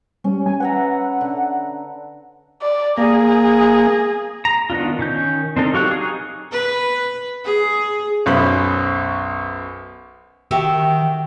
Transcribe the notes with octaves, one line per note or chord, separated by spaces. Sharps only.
G3 C#4
G#5
B4 E5 F#5 A#5
D3
D5
A#3 G#4
A#5
D#3 B3 D4 F4
D#3 C#4 G6
C4 D4 D#4 A4 A#4
F#3 G4 F5 C#6 F#6
D#4 G#4
B4
G#4
B1 F#2 C#4 C5 B5 D#6
D#3 F#4 G4 E5